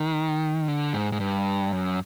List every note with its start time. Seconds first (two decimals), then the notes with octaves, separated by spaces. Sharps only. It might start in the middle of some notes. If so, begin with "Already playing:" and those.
Already playing: D#3
0.68 D3
0.93 G#2
1.12 G#2
1.20 G2
1.72 F#2